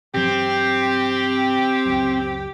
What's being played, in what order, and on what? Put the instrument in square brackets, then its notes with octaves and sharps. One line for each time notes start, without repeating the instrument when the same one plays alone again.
[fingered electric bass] G2 E3 F#3 [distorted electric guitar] C4 [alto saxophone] G4
[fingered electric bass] C#2 F#2